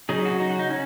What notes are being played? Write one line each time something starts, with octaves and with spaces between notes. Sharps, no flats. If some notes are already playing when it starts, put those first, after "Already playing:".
C#3 F#3 C#4 D#4 G#4
F#4
D#4
F#4
D#4
C#4